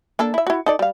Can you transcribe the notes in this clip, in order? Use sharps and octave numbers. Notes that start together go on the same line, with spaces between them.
A#3 D4 A4
E4 E5
E4 F#4
D#4 A4 D5
G3 F5